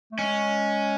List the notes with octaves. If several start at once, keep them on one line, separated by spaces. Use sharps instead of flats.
A3
G#3 C#4